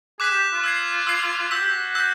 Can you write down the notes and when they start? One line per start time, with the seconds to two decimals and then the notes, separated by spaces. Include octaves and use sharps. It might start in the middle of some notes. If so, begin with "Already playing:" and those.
0.20 G#4 D6 F#6 B6 E7
0.30 G4
0.53 F4
0.64 E6 G#6 C7
1.07 E6 G#6 C7
1.51 F#4 E6 G6 B6
1.61 G4
1.69 F#4
1.95 E6 G6 B6